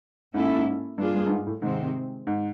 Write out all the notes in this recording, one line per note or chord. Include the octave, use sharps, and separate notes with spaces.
G#2 A#3 C#4 E4 A4
A2
G#2
G2 G3 A#3 D4 F4 G#4
G2
G2
G#2
A2
G#2 C3 D#3 G#3 C4
G#2